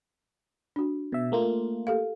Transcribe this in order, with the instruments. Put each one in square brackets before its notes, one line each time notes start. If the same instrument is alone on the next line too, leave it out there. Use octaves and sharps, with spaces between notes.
[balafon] D4 F#4
[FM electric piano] B2 E5
A3 A#3 F4
[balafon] G4 A4 F5